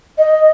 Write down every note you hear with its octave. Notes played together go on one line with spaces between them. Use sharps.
D#5